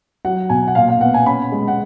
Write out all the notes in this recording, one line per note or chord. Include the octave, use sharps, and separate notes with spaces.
F#3 F#5
B2 G#5
F#5
A#2 F5
F5
B3 F#5
G#5
C#4 B5
G#3
F#5